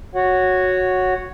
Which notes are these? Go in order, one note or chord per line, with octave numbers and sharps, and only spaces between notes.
F#4 C#5 F#5